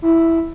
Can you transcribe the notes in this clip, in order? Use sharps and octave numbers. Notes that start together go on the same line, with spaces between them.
E4